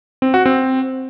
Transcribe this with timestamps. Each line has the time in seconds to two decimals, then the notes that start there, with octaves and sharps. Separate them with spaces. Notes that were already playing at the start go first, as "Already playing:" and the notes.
0.22 C4
0.34 F#4
0.46 C4